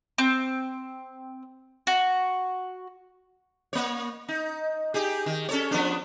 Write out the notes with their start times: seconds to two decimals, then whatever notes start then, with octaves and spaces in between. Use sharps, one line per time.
0.18 C4
1.87 F#4
3.73 A#3 C#5
4.28 D#4
4.94 D#4 G4 G#4
5.26 D#3
5.49 C#4 A4 C#5
5.71 F3 B3 D4